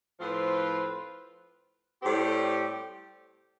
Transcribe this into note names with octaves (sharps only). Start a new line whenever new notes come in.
A2 F3 C4 F4 B4
A2 G3 C4 G4